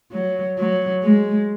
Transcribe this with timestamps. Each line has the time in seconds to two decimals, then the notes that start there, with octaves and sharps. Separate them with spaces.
0.12 F#3
0.58 F#3
1.04 G#3